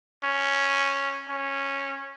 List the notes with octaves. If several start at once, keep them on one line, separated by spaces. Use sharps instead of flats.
C#4
C#4